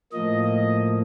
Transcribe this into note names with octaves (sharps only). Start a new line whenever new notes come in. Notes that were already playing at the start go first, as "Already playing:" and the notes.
A2 F3 A#3 D#5
D#5